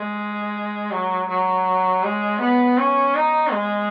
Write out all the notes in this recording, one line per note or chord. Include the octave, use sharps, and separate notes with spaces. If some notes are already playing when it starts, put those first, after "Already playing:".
Already playing: G#3
F#3
F#3
G#3
B3
C#4
D#4
G#3